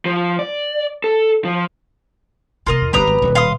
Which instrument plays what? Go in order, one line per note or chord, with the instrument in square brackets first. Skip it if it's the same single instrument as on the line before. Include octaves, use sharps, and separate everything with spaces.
[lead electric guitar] F3
D5
A4
F3
[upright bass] C3 B3 [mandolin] F4 A#4 D#5
[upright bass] E2
[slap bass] G1 C3 [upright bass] G3 B3 [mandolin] G4 A#5 D#6 [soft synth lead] B4
[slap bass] G#1
[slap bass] D#1 [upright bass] B2
[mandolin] F5 C6 D#6